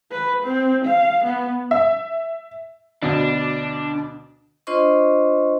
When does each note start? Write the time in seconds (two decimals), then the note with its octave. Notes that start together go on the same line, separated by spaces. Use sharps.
0.11 B4
0.43 C4
0.85 F5
1.24 B3
1.71 E5
3.03 D2 B2 D4
4.67 D4 F4 C5 D#5 C6 C#6